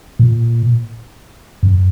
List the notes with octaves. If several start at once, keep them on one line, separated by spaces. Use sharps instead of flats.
A#2
F#2